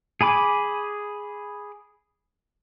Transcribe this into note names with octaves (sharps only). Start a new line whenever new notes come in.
G#4 G#5 B5 D6